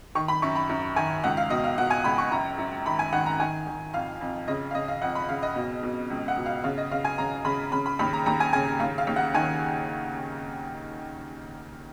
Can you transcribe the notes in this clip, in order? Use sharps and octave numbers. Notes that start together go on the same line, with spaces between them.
D#3 C#6
B5
F#2 C#6
B5
F#2
D#3 G#5
C#2 F#5
F5
B2 D#5
F5
B2 F#5
G#5
C#2 B5
C#6
F#2 A#5
F#2
D#3 B5
G#5
D#3 F#5
A#5
D#3 G#5
D#3
F2 F5
F2
C#3 D#5
F5
C#3 D#5
F5
F2 F#5
B5
C#3 F5
D#5
B2
B2
C#2
F#5
B2
F5
C#3 F5
D#5
C#3 F5
G#5
C#3 A#5
C#3 B5
C#3 B5
B5
D#2 B5
A#5
D#2 A#5
G#5
C#3 G#5
D#2 F5
F5
D#2
F#5
D#3 G#5